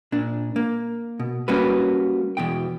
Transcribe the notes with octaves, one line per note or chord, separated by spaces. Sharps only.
A#2 D4
A#3
B2
G3 A#3 C#4 F#4 B4
E2 B2 G5